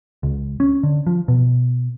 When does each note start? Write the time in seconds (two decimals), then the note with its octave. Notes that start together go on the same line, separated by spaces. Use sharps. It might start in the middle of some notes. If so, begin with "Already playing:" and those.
0.23 C#2
0.60 C#4
0.83 D3
1.07 F3
1.28 B2